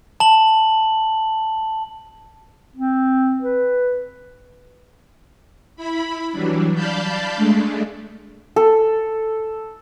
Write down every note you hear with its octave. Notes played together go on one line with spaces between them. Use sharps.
A5 F#7
C4
B4
E4 B5
E3 F#3 G3 D4
D5 F5 A5 B5 G6
G#3 A3 D4
A4